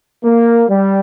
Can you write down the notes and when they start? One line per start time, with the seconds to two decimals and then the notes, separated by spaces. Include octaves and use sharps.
0.24 A#3
0.69 G3